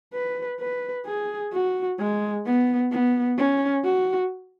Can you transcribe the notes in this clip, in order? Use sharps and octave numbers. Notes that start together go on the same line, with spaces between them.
B4
B4
G#4
F#4
G#3
B3
B3
C#4
F#4